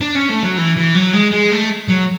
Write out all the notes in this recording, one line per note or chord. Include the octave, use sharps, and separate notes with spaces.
D4
C#4
A3
F#3
E3
E3
F#3
G#3
G#3
A3
F#3